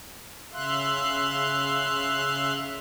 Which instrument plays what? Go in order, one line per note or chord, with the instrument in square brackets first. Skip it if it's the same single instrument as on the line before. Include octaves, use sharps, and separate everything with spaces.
[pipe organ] C#3 E5 F5 C6 F#6